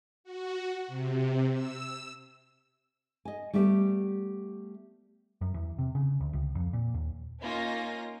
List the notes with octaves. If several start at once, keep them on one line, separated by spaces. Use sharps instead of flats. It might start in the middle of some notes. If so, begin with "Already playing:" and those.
F#4
C3
E6
D#5 G#5
G3 A3 B3 G4
F#2
E2
C3
C#3
D2
C#2
F2
A#2
D#2
A#3 C#4 D#4 F4 A#6